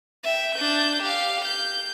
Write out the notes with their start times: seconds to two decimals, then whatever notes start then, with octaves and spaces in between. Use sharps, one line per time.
0.24 E5 G5
0.55 D4 G6
1.03 G4 F5
1.45 G6